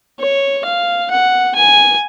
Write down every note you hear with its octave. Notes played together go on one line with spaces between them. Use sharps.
C#5
F5
F#5
G#5